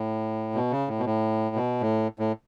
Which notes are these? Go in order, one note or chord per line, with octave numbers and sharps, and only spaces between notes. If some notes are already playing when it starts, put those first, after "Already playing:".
Already playing: A2
B2
C#3
A2
B2
A2
B2
A2
A2